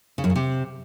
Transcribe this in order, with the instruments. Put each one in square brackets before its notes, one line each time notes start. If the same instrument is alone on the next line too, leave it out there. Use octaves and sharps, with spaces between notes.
[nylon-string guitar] C#3
F#2
C#3
C3